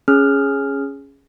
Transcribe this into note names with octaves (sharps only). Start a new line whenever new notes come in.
C#4 G#4 F6